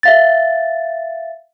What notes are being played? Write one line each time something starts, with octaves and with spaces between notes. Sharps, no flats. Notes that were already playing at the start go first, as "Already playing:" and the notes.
E5 F5 A6